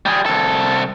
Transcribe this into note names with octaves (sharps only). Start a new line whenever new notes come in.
G3 G#4
C2 A4